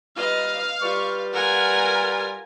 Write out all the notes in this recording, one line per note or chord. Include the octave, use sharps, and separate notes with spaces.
G3 D#4 F4 B4 D#5 F5
G3 F4 B4 C#6
F4 A#4 F#5 G#5